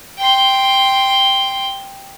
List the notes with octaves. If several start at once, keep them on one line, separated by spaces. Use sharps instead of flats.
G5 C6